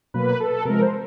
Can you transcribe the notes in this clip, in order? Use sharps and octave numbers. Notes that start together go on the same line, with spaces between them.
B2 F#3 A#3 B4
A4
C3 F3 G#3 A#4
C5